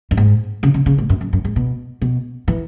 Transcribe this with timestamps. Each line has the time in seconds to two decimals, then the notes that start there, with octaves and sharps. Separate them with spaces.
0.11 F#2
0.17 G#2
0.63 C#3
0.74 C#3
0.86 C#3
0.98 G#2
1.09 F#2
1.21 F#2
1.33 F#2
1.44 G#2
1.56 B2
2.02 B2
2.48 E3